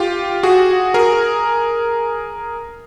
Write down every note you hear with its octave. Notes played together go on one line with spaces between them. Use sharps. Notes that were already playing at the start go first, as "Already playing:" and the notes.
Already playing: F4 G4
F#4 G#4
G#4 A#4